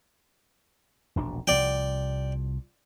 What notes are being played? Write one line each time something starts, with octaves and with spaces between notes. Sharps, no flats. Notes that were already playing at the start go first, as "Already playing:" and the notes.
E1 A#1 D4
C2 F3 D5 G5